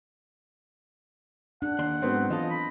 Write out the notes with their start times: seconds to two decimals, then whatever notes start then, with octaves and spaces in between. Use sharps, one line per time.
1.62 D4 F#5
1.79 D#2 D5 C6
2.02 G#2 F#3 B3 C4
2.30 E3 F4 A4 D#5
2.50 B5